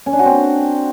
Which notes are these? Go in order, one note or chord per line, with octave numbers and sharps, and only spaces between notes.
C#4
D4
F#4
C4